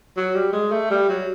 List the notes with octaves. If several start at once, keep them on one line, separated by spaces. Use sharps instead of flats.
F#3
G3
G#3
A3
G3
F#3